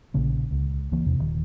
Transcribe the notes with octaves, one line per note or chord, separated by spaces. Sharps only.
A#1 C#3 A#3
C#2
C#2 E3 A#3
E2 C3
D#1 D#3